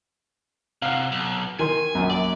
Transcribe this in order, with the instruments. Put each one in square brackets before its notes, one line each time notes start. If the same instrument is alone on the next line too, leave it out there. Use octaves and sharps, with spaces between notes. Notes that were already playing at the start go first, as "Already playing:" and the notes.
[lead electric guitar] C3 [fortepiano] F5 F#5
[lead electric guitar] B1
[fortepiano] D#3 C6 [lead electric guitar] G#5
[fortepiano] A#1 F#2
[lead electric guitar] D5